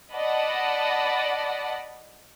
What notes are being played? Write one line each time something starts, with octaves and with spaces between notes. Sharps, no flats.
D5 D#5 F#5 A5 B5